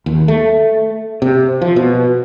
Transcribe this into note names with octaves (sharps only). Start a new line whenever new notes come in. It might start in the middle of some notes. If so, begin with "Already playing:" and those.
D#2
A3
C3
F3
B2